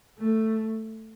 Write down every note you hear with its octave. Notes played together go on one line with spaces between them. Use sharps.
A3